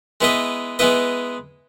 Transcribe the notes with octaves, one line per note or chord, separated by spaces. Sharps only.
G#3 B3 E4 B4 D#5
G#3 B3 E4 B4 D#5